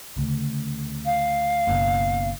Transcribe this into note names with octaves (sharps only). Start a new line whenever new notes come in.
D2 C#3
F5
F#1 B2